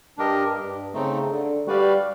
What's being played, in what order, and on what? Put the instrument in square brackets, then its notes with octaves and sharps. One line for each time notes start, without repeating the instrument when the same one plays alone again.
[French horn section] G2 [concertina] D4 G4 A#4 D#5
[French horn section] G2
[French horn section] C#3 [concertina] A3 C4 D#4
[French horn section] D3
[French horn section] G3 [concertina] F#4 B4 D5 F5